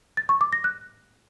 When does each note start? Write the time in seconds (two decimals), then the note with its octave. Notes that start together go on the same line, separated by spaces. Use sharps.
0.17 A6
0.29 C#6
0.41 D6
0.53 A#6
0.64 F#6